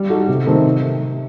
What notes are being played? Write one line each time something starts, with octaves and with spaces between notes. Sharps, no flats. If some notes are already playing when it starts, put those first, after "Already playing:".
Already playing: G3
D#4 F#4 A4
C3
D#3 A3 C4
C3